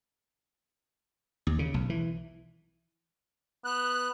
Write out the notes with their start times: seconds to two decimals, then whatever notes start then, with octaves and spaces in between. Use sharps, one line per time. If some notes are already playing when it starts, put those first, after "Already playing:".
1.47 D#2
1.59 C#3
1.74 B1
1.90 E3
3.65 B3 F#6